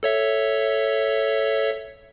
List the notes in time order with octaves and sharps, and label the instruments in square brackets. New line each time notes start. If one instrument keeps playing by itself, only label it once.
[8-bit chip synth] A4 C#5 E5